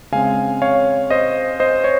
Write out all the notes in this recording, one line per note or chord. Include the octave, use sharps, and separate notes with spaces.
C#3 G#3 C4 F5 G#5
C#5 F5
C5 D#5
C5 D#5
C#5